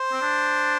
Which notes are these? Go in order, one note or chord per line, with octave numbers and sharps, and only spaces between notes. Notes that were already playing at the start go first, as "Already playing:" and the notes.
Already playing: C5
C4
D4